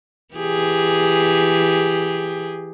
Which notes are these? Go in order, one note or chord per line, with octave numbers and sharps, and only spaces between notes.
E3 G4 G#4